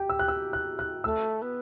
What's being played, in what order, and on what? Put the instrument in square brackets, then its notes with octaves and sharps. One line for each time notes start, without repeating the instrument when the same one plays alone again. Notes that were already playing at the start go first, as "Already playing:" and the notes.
Already playing: [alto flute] G4 [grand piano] G5
[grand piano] E6
F#6
E6
F#6
F#6
[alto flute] A3 [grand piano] E6
[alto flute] B3